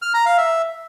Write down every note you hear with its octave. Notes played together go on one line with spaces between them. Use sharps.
F6
A#5
F5
E5